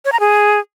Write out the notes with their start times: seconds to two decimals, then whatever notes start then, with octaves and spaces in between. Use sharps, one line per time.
0.05 C#5
0.12 A#5
0.20 G#4